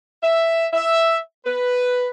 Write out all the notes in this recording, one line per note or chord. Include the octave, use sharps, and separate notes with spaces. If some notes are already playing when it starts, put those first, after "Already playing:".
E5
E5
B4